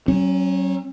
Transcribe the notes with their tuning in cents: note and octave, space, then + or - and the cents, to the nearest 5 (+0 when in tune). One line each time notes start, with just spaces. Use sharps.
F#3 +30 C#4 -25